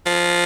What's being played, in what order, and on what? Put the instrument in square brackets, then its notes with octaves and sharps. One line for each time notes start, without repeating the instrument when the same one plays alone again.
[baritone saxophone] F3